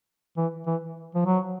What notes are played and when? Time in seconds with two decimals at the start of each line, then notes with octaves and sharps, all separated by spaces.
0.37 E3
0.67 E3
1.15 F3
1.26 F#3